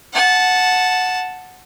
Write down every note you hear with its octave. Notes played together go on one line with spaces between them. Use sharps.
F#5 A5